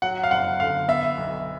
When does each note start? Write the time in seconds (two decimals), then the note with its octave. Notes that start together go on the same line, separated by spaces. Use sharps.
0.02 F#3 F#5
0.24 F5
0.31 F#1 F#5
0.60 D3 F5
0.88 B3 E5
1.18 B1